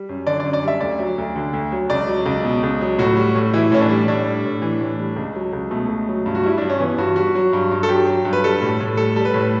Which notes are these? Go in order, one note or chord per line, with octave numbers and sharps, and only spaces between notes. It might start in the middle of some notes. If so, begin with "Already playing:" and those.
Already playing: G3
F#2
D3 D5
D5
F#2
D5
G3 E5
D2 D5
F#3
D2
D3
D2
F#3
C#2 D5
F#3
C#2
B2
C#2
F#3
A2 F#4
G3
A2
E3 E4
A2 C#4
D4
G3
A2 D4
G3
A2
E3
A2
G3
C#2
F#3
C#2
B2 A3
C#2
F#3
G2
F#4
G3 E4
G2 D4
C#4
E3 B3
G2 F#4
G3 F#4
F#3
G2
G2
A4
F#3 G4
F#3
G2
B4
G3 A4
A2
A2
G3 A4
G3 A4
B4
A2